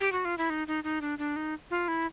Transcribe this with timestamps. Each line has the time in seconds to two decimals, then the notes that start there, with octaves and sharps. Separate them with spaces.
0.00 G4
0.12 F#4
0.25 F4
0.38 E4
0.50 D#4
0.67 D#4
0.84 D#4
1.01 D4
1.18 D4
1.36 D#4
1.70 F4
1.88 E4